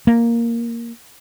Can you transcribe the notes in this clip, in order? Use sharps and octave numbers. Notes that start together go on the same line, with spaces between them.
A#3